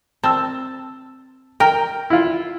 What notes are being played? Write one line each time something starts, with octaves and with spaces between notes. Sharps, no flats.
C4 A5 E6
A#4 G5
E4 F4